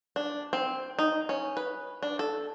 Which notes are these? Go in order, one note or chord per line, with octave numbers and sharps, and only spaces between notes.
D4
C4
D#4
C#4
B4
D4
A4